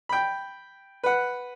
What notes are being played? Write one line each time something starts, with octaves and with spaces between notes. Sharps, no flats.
G5 B5
B4 F#5